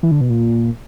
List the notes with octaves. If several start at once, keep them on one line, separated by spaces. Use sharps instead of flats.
E3
D3
B2
A#2